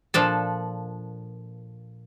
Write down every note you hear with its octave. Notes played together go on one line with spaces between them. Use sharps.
A#2 F3 D4 A4